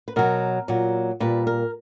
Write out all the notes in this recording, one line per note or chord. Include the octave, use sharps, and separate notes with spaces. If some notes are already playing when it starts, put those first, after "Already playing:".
B4
B2 F#3 A#4
A#2 F#3
A#2 G3 B4
A#4